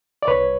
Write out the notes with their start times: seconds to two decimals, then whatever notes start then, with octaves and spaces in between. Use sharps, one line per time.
0.23 D5
0.27 C2 B4 C#5